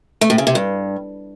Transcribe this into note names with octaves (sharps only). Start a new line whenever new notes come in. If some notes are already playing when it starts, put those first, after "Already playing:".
A3
A2
C#3
C3
G2